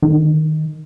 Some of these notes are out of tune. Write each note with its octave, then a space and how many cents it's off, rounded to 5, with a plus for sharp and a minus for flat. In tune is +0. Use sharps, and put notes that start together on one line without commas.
D#3 -5